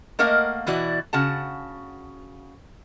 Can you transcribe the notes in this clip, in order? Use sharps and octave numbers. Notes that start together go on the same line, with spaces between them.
A3 A#3 A#4 D#5 F5 F#5
B2 E3 E4 F#4 D5
C#3 F#4 F#5 A5